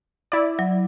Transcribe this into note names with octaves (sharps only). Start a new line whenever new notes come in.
E4 D5
F#3